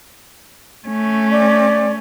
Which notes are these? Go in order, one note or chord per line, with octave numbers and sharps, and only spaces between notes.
A3 C#4
D5